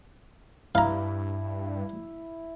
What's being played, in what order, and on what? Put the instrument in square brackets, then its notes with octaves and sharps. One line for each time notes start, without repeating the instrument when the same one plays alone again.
[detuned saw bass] G2 [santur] E4 [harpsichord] F5 A#5